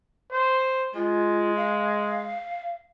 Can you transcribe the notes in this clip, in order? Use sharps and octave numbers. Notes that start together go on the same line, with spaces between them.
C5
G#3 F4
F5